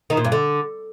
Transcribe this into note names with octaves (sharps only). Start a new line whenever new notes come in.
D#3
A#2
G2
D3